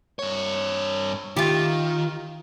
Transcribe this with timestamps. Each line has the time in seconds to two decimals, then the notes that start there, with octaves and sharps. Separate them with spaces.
0.19 G2 C#5
1.37 D#3 F4 G4